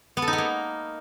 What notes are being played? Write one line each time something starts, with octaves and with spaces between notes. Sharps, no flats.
B3
A4
D#4
B3
A#3